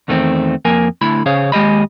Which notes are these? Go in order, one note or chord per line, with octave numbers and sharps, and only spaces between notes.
E2 D#3 A3 B3 C4
F2 A#3 A#4 G#5
D3 A3 E4 B5
C#3 C#4 G#4 C5 C#5 F5
D#2 G#3 G4 D#5 B5